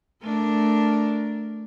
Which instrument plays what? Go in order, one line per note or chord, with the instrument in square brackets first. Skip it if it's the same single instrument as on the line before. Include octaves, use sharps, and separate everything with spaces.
[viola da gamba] A3 D4 A#4